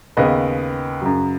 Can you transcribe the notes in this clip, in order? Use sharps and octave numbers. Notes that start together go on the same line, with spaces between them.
D#2 C#3 B3 B4 D#5
F#2 C#3 F#3